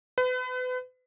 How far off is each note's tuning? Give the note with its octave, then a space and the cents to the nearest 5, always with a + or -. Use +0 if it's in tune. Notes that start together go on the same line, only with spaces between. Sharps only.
B4 +35